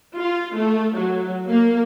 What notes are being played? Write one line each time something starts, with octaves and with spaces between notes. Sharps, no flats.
F4
A3
F#3
A#3